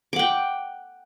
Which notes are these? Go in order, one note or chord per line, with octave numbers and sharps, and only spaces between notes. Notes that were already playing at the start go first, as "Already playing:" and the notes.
F#5 G5 D6